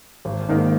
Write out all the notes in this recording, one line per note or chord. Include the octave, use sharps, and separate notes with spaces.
G#1
G#2 D#3 A#3 D#4